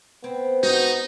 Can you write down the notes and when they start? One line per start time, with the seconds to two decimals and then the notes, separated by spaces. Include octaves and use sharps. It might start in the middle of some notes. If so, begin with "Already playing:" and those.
0.24 B3 C4
0.63 D#4 F#4